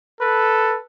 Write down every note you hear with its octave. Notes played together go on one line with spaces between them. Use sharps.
A4 B4